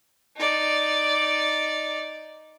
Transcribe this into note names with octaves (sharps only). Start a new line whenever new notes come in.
D#4 D5